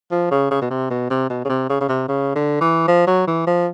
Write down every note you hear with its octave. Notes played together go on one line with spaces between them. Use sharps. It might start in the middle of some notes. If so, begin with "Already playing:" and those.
F3
C#3
C#3
B2
C3
B2
C3
B2
C#3
C3
C#3
C#3
C3
C#3
D3
E3
F3
F#3
E3
F3